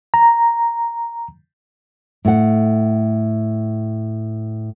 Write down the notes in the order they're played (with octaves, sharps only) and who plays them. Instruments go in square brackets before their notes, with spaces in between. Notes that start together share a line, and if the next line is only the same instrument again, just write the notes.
[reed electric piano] A#5
[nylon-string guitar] A2 F#5